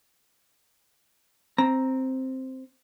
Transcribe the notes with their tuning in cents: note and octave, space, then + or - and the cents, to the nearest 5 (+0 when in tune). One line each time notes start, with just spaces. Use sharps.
C4 +0 A#5 +0